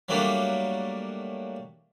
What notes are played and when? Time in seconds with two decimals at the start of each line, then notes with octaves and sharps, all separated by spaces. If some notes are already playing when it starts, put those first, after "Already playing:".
0.09 F#3 G3 A3 A#3 D4